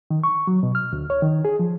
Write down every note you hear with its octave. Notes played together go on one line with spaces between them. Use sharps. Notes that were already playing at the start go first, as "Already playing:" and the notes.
D#3
C#6
F#3
B2
F6
D2
C#5
D#3
G#4
F3